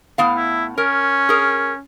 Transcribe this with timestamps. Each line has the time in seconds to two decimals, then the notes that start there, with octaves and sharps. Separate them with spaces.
0.18 A2 B3 F5
0.36 E4
0.78 C#4 A#4
1.29 G#4 A#4